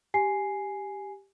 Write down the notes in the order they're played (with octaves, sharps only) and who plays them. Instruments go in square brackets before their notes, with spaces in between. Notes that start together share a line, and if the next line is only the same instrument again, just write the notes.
[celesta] G4 G#5 C7